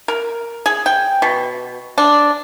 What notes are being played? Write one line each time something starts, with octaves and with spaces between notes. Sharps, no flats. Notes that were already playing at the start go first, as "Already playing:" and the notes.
A#4
G#4
G5
B2
D4